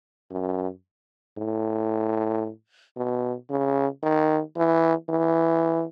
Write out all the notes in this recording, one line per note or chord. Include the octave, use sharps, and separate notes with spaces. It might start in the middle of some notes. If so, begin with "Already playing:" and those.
F#2
A2
B2
C#3
D#3
E3
E3